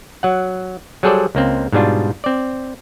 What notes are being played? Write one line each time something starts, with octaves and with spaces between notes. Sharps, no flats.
F#3 F#5
F#3 G3 G#4 A4 C5 D5
C#2 A#3 C4
G#2 B2 G3 D4 F4
C4 D5